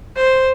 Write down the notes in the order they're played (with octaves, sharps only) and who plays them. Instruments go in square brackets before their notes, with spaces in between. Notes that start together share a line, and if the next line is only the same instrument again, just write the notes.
[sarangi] C5